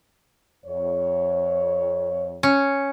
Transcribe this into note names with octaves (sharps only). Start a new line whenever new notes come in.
F2 C#5
C#4